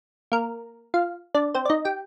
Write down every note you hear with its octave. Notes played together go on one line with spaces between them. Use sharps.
A#3 A#4
F4 F5
D4 D5
C4 C5
D5
D#4 D#5
G4 G5